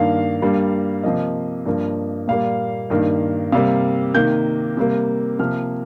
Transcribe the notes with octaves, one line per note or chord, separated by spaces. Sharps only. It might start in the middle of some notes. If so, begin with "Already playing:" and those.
Already playing: G2 D#3 A#3 F5
G2 G3 A#3
C3 F3 A#3 D#5
G2 F3 A#3
A#2 G3 A#3 F5
G2 D#3 A#3
C3 G3 A#3 F5
C3 D#3 A#3 G6
C3 G3 A#3
C3 F3 A#3 F6